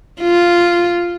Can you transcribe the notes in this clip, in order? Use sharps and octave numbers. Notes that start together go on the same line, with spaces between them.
F4